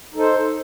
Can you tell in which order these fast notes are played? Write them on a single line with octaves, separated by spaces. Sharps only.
D#4 A4 C5